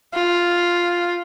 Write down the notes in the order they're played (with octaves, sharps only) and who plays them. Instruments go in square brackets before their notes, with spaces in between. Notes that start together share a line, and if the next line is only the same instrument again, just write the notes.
[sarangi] F4